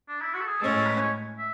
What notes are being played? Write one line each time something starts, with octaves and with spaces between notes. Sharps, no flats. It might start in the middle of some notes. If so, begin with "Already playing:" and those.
D4
E4
F#4
A4
G#4
A2 G#3 C#4 A4
A4
B4
C#5
E5